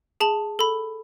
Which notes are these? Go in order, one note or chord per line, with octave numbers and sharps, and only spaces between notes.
G#4 A5 F#7
A4 B5